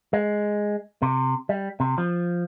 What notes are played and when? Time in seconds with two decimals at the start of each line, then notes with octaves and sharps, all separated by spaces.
0.13 G#3
1.02 C3
1.49 G3
1.80 C3
1.98 F3